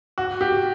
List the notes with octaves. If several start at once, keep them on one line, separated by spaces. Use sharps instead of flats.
F#4
G4